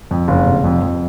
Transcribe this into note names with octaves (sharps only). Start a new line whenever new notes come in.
F2
F#1
F1
F2
F2